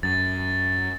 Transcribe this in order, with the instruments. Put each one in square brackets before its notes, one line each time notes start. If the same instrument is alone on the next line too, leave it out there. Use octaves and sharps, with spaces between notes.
[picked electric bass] F#2 [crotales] A6